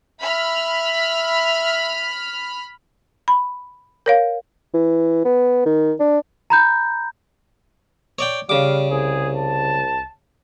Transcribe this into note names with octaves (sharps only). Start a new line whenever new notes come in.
E5 B5 F6
B5
A#4 C#5 F5
E3
B3
D#3
D4
A#5 B5 G6
C#5 D5 G5
C#3 G3 F5 D6
C2 G#4
A5